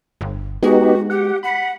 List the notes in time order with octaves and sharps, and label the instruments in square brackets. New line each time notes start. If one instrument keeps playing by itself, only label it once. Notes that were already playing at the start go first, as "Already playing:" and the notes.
[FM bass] G1
[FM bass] G#3 [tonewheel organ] B3 D#4 G4 [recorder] F#4
[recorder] G4 [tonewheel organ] F#5
[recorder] F#5 [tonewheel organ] B5